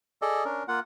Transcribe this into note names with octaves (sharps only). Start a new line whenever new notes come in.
G#4 A4 D5 D#5
C#4 D4 A#4
A#3 F4 F#5